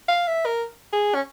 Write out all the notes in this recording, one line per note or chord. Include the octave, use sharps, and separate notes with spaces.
F5
E5
A#4
G#4
C#4